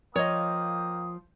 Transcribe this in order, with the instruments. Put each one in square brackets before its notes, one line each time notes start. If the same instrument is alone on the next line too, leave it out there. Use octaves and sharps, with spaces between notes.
[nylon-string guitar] F3 [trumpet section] A#3 G5 D#6 [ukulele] C#5 D#5